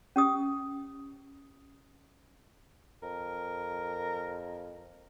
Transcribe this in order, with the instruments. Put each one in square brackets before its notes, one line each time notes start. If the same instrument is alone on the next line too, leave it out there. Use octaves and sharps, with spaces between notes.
[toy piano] C#4 G4 D#6
[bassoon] F2 [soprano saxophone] A#4